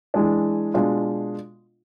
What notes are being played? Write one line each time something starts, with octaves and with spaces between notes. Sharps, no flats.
E3 G#3 D4
B2 G#3 D4 F4